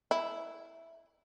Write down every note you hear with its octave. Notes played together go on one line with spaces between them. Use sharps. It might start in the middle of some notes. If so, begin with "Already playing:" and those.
E4